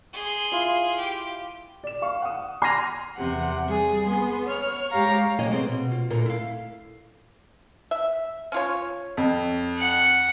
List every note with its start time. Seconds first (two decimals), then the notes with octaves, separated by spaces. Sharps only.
0.14 G#4 C6
0.52 E4 F4
0.98 G4
1.83 D5 E7
2.02 F5 C#6
2.22 F#5 D#6
2.62 C6 F6 G#6 A#6 D#7 F7
3.18 E2 C3 F#5
3.67 G3 G#4
4.06 B3 G#4 C6
4.47 C#5 F6
4.91 G#2 G4 C#5 F5 A#5
5.39 C3 F#3 A#3 C#5 D#5 G#5
5.51 B3 C4 G#4
5.69 B2
5.92 F4
6.10 D2 A#2 D3 A#4
6.26 E4 F5
7.91 E5
8.52 C#4 F4 C#5
9.17 F2
9.78 F#5